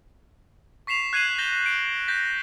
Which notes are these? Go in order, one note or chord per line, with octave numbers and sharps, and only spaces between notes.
C#6 B6 C7 E7 F7
F#6 G#6 C7 D#7 E7 F#7
G6 A#6 E7 G7
D7
G6 A#6 B6